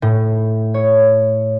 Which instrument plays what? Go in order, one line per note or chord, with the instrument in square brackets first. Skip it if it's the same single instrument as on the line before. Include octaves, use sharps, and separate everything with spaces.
[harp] A2
C#5